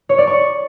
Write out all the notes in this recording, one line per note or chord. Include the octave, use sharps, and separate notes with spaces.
C#5
D5
C#6